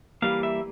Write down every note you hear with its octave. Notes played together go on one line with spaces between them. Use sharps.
E3 G3 A#3 F5
E5